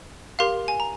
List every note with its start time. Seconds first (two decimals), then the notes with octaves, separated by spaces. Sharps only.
0.39 G4 A#4 F5 C6
0.68 G#5
0.80 A#5